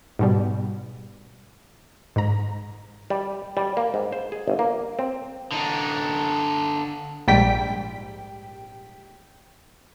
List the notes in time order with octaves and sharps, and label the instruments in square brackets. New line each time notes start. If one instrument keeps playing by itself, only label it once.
[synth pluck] G#2 B2 G3
G#2 A#5
[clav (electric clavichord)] G3
G3
A#3
G#2
C5
G#4
G1
A#3
C4
[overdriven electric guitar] D3 D#4
[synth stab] A#1 G#2 G3 G5 B6